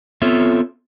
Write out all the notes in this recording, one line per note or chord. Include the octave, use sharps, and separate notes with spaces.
B3 C4 F4 A4 C#5 E5